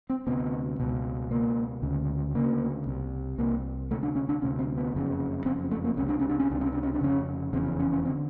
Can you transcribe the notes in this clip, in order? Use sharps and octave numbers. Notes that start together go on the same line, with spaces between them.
C4
D2 C3 B3
C#2 B2
C#2 B2 A#3
D2 C#3
D2 C#3 A#3
C2 C3
C2 C3 A#3
D2 C3 A3
D4
C#4
D4
D2 C3 C#4
C4
B3
F#1 F2 C#3
F#1 F2 C#3 C4
A3
A#3
C#2 C3 C#4
D4
C#4
D4
C#4
C#2 C3 D4
C#4
D4
C#4
D4
F1 E2 C#3 C#4
F1 E2 C#3 C4
C#4
C#4
C#4
D3 C4